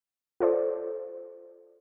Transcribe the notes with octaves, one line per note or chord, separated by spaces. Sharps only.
F4 A4 C5 D5